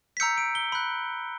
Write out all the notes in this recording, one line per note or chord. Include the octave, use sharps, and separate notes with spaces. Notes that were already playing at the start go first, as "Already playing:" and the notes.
B6
A#5 E6 G6 C#7
D7
G7
B5 F#6